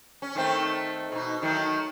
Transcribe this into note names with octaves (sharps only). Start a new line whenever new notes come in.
C#4
D#3 A3 C4
B2 D#4
D#3 F#3 A3